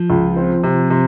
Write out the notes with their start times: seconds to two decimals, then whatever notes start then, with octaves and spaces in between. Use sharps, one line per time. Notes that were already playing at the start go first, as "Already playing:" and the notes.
Already playing: F3
0.10 C#2
0.36 C4
0.63 C3
0.90 C3